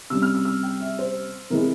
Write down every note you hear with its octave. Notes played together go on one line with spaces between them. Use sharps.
C3 G3 C#4 E6
F6
E6
E6
G5
E5
C5
C3 E3 G#3 A#4